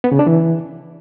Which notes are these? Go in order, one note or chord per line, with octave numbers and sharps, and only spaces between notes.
B3
C#3
D4
E3